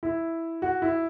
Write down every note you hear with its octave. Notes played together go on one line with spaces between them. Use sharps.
E4
F#4
E4